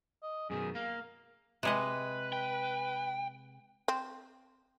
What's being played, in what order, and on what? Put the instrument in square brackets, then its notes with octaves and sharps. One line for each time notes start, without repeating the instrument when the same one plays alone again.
[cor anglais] D#5
[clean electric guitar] F#2 B2 D#3 [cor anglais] G#4
[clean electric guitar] A#3 [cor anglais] F5
[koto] C3 G#3 D#5 [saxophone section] B4
[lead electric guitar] G5
[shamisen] C4